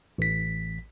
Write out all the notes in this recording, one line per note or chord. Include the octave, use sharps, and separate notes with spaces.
A1 B6